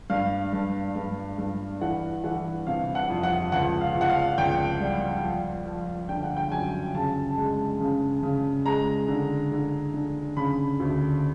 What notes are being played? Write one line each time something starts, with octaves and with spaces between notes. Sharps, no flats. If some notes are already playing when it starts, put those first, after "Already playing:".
G2 F5
G2
G2
G2
E3 F#5
E3 F#5
C3 F5
F#5
F2
F#5
C#2 F#5
F5
C#2
F#5
F5
C#2 G5
G3
F3
F3
D3 G5
F#5
G5
F#2 G#5
C#3 A5
G#3
C#3
C#3
G#3 A#5
D3
D3
D3
C#3 B5
D2